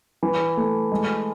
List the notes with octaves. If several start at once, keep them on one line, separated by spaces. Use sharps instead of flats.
E3
A3
G#3